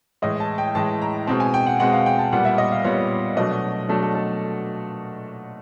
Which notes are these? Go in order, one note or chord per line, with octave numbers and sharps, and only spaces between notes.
A2 E3 G#3 D#5
A5
G5
A2 E3 G#3 A5
A#5
B2 G#3 C4 A5
G#5
G5
F#5
B2 G#3 C4 F#5
F5
G5
A5
A#2 G3 B3 F#5
E5
D#5
F5
A#2 G3 B3 C#5
B2 F#3 A3 D4 D#5
B2 F#3 A3 D4 A4
A4
A4